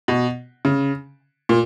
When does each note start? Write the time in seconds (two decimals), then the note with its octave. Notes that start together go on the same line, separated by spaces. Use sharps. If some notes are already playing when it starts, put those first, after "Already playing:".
0.08 B2
0.65 C#3
1.49 A#2